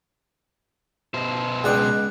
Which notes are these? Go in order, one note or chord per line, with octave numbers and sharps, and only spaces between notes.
B2 C5
C#2 G#4 D5 F#5 G5